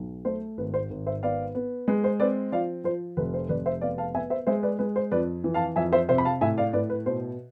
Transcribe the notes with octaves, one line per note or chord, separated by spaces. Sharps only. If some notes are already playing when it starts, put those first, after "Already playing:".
Already playing: B1
A3 C5
G#1 B4
C5
G#1
C5 E5
B3 D5 F5
B3
G#3 B4
C5
C4 B4 D5
F3 D5 F5
F3 C5
F1 B4
C5
F1 B4 D5
C5 E5
B3 D5 F5
F5 A5
B3 E5 G#5
C5 E5
G#3 C5 E5
B4 D5
G#3 B4
C5
F2 B4 D5
E3
F5 A5
F2 E5 G#5
C5 E5
C3 C5 E5
B5
F5 A5
A2 E5 G#5
D5 F5
A2 B4 D5
B4
B2 C5